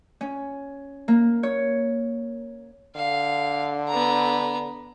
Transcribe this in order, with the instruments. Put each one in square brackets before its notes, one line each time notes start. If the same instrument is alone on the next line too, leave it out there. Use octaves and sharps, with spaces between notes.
[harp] C#4
A#3
C#5
[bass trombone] D3 [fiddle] F5
[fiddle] B3 A#5